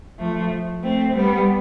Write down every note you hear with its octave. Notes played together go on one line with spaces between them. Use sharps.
F3 A3
A3 C4
G3 B3